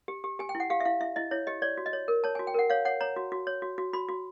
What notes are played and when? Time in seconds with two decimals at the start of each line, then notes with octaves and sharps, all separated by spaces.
0.08 G4
0.24 G4
0.39 G4 G#5
0.49 G5
0.55 E4
0.60 F#5
0.70 G4 F5
0.80 E5
0.85 E4 F5
1.01 E4 E5
1.16 E4 D#5
1.31 E4 C#5
1.47 G4 D#5
1.62 C#5 D5
1.77 F#4
1.86 D#5
1.93 C#5
2.08 A#4
2.24 C#5 A5
2.35 F#4 G#5
2.47 G5
2.54 A#4 F#5
2.70 C#5 F5
2.85 C#5 F#5
3.01 C#5 A#5
3.16 F#4
3.32 F#4
3.47 C#5
3.62 F#4
3.78 F#4
3.93 F#4 B5
4.09 F#4